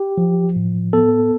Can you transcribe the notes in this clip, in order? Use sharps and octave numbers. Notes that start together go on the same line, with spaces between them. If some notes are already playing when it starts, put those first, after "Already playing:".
Already playing: G4
F3
A2
B3 A4